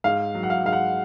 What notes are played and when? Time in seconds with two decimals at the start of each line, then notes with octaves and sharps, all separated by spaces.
0.04 G#2 F5
0.35 F#3
0.43 F#5
0.50 F5
0.65 G#2 F5
0.73 F#5